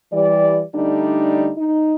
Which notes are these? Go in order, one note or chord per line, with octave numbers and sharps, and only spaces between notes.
E3 G3 D5
D3 G3 A3 D4 D#4
D#4